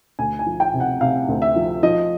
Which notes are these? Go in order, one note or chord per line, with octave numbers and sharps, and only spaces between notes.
D2 G#5
G#5
F3
G5
C3
F#5
C3 F5
D2
E5
F3
F3 D#5